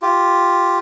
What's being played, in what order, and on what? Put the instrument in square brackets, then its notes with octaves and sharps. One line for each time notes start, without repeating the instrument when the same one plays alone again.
[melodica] F4 G4